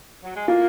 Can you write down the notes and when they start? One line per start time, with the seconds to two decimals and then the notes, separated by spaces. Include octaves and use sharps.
0.23 F#3
0.36 G#3
0.48 A#3 F4